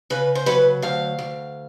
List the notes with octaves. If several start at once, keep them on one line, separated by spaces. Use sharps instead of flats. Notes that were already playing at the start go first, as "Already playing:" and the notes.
C#3 B4
C5
F#3 B4
D2 F5
D2